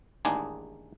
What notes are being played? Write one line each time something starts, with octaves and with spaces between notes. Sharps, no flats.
A1 D#2 G#3 D4 D#4 G#4